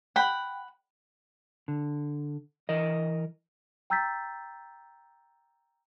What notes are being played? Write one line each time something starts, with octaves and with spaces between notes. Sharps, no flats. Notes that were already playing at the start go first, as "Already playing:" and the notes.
F#5 G5 B5
D3
E3 A#4 D#5
G5 A#5 E6 G6 A6 B6